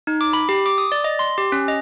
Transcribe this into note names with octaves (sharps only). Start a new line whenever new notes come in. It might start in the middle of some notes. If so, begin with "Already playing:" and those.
D#4
D6
B5
G4
D6
D#6
D5
D#5
C6
G4
C#4
D#5